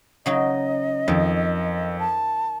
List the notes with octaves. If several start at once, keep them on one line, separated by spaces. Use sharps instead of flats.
C#3 F#3 D#4 D#5
F2 D#3
A5